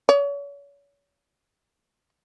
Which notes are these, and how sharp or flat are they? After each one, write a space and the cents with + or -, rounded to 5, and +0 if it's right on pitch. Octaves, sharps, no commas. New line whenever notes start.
C#5 +40